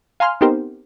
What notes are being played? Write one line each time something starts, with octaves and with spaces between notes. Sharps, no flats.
F5 G#5 A#5 C6 F6
B3 C4 D#4 G4 A#4 C5